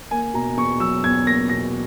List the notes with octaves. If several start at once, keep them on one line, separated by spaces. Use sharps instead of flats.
A#3 G#5
B2 A#5
E2 C#6
F#3 E6
E2 G#6
A#3 A#6
B2 A#6